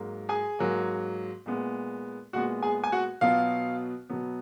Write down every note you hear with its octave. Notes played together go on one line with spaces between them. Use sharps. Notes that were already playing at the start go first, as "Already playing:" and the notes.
Already playing: G#2 F#3 A#3
G#4 G#5
G#2 F#3 A#3
A#2 G#3 B3
A#2 G#3 B3 F#4 F#5
G#4 G#5
G#5
F#4 F#5
B2 F#3 B3 F4 F5
B2 F#3 B3